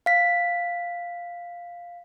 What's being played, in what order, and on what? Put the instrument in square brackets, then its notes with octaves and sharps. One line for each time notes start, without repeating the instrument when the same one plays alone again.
[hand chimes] F5 B6